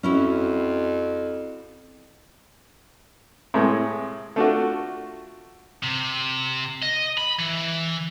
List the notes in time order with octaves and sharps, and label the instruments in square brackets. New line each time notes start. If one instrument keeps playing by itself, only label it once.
[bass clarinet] F2 [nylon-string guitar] C#4 E4 F#4
[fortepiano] A2 C3 G#3
A3 D4 F4 F#4
[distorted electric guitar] C3
D#5
B5
E3